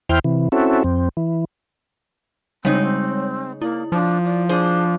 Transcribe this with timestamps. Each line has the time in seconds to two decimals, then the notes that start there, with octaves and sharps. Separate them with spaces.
0.09 E2 E4 C5 G5 F6
0.24 C3 E3
0.52 C4 C#4 E4 F#4 A4
0.84 F2 C4
1.17 E3
2.65 C#3 G3 G#3 C4 D#4 C#5
2.82 C4
3.62 A#3 E4
3.92 F3 D4
4.25 D5
4.49 D4 G#4 C5